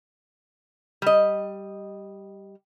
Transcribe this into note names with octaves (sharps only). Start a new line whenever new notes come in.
G3 D#5